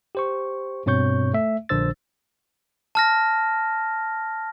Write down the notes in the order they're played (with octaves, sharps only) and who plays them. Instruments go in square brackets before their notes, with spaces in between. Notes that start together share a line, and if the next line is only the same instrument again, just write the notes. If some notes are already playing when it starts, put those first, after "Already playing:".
[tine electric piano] G4 C5 C#6
G2 B2 C4 C#5 C#6 G6
A3 E5
A#1 D3 D4 C5 E6 A6
[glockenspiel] A5 F6 A#6